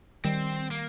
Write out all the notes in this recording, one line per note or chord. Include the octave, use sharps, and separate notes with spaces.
D#3 G3 C4
A#3